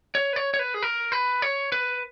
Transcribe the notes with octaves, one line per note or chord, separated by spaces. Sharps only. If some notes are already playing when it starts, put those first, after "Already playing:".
C#5
B4
C#5
C#5
B4
G#4
A#4
B4
C#5
B4